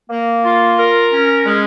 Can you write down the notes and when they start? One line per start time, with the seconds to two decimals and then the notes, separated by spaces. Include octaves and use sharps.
0.09 A#3
0.44 F4
0.78 A#4
1.12 C#4
1.46 G#3